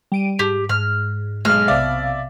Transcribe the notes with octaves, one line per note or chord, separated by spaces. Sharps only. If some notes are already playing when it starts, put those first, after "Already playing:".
G3 D7 D#7
G#2 G4
G#2 F6
B1 G#3 F6
B1 C3 D5 E5 F5